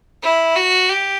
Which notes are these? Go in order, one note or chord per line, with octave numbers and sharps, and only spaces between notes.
E4
F#4
G4